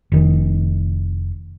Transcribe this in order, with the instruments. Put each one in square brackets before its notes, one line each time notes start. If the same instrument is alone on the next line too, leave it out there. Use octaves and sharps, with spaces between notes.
[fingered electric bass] F1 D#3